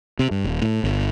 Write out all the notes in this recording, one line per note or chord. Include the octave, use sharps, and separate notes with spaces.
C3
G2
D#1
A2
G1